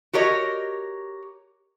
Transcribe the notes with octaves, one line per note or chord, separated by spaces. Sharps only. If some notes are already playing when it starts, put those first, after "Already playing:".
F#4 G4 A#4 C#5 D#5